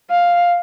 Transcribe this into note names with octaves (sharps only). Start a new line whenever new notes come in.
F5